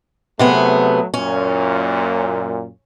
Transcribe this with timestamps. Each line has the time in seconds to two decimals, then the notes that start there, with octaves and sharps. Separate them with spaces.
0.39 C3 F#3 A3 B3 G#4
1.14 F#2 A#2 C#4